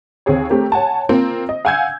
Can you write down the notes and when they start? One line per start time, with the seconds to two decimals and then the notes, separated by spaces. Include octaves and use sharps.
0.26 D#2 C4 G#4 C#5
0.50 A3 C4 G4 A#4
0.72 C#5 F#5 G#5 A5
1.09 A#3 C4 F4 C5
1.49 D#5
1.65 F5 F#5 G#5 E6 G6 G#6